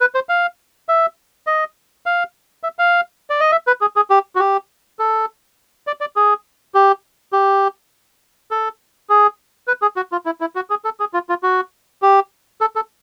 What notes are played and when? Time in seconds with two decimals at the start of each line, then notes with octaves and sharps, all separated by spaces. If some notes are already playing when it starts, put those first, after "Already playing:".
0.01 B4
0.15 C5
0.29 F5
0.89 E5
1.47 D#5
2.06 F5
2.63 E5
2.79 F5
3.30 D5
3.40 D#5
3.52 E5
3.67 B4
3.81 G#4
3.96 G#4
4.10 G4
4.36 F#4
4.40 G4
4.99 A4
5.87 D5
6.01 D5
6.16 G#4
6.74 G4
7.32 G4
8.51 A4
9.09 G#4
9.67 B4
9.82 G#4
9.96 F#4
10.12 F4
10.26 E4
10.41 E4
10.56 F#4
10.70 G#4
10.85 A4
11.00 G#4
11.14 F4
11.29 F4
11.43 F#4
12.02 G4
12.61 A4
12.76 A4